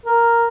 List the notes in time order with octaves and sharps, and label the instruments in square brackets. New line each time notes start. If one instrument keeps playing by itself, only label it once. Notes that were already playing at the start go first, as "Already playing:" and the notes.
[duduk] A#4